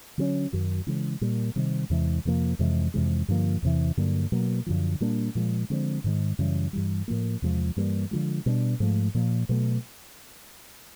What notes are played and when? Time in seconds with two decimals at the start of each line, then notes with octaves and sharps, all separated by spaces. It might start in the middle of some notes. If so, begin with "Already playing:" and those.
0.18 D3 F#3 A3 C#4
0.53 F#2 D#3 F#3
0.87 C#3 E3 G#3
1.21 A#2 G3 A#3
1.56 C3 D#3 G3
1.90 E2 C3 E3 G#3
2.25 F2 C3 F3 A#3
2.59 F2 C3 E3 G#3
2.94 F2 C3 E3 G#3
3.28 G2 D3 F3 A#3
3.62 E2 C3 E3
3.97 G2 D3 F#3 A#3
4.32 B2 F#3 A#3
4.66 F#2 D3 F3
5.00 A#2 G3 A#3 D4
5.35 A#2 F3 G#3
5.70 D3 F3 G#3 C4
6.04 G#2 D#3 G#3
6.38 F#2 C#3 E3 G3
6.73 G2 E3 G3
7.08 A2 F3 A#3
7.42 E2 C3 F3 G#3
7.76 G2 E3 G3 A#3
8.11 D3 F3 G#3
8.46 B2 G3 B3 D4
8.80 G#2 F3 A3
9.14 A#2 F3 A#3
9.49 B2 F#3 A3